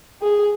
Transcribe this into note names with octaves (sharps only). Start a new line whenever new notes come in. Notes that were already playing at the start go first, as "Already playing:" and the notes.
G#4